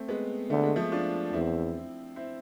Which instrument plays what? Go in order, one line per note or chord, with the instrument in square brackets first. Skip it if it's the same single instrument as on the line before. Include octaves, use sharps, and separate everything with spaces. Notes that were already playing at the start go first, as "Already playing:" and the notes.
Already playing: [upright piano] A3 C4
G#3 B3
[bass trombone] D3 [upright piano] A3
[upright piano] G#3
F3 A3
D4 F4
[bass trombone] E2 [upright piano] C4 E4
[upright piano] C4 E4